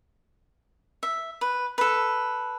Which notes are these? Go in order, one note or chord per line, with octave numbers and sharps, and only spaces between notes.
E5
B4
A4 B4